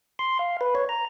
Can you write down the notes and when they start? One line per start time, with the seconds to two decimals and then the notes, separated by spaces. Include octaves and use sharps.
0.19 C6
0.39 F5
0.61 B4
0.75 C#5
0.89 A#5